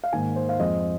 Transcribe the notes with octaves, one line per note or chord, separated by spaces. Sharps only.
F5
G#2 D#3 A#3 G#5
C5
F5
F2 F3 G#3 C4 D#5